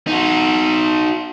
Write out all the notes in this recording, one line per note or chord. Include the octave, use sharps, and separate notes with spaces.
D#4 F#4